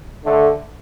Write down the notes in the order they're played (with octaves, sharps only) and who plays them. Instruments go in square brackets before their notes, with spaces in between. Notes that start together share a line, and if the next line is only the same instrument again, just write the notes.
[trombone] D3 [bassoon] A3